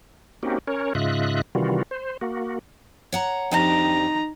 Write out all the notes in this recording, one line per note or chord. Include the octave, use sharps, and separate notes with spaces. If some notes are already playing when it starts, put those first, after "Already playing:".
A#3 C4 C#4 D#4 F#4 G4
C#4 A#4 C#5
G#2 C#3 F4 D#5 E5 F#6
C3 D#3 E3 G3 F4 F#4
C5
A#3 F#4
C#5 F#5 A#5
F2 D4 D#4 G4 A#5